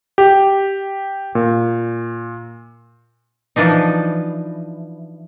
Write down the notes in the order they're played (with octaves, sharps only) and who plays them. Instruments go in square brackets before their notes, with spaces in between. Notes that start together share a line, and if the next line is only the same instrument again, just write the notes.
[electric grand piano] G4
A#2
[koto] E3 F3 D4 D#4